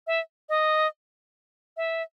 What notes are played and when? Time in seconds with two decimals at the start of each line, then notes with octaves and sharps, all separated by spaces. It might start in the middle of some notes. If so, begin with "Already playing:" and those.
0.07 E5
0.49 D#5
1.77 E5